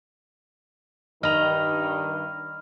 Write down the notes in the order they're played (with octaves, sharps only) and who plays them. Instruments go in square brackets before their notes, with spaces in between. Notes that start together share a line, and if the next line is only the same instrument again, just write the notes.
[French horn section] G2 D#3 [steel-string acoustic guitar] D#5 A#5 [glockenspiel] B5 F6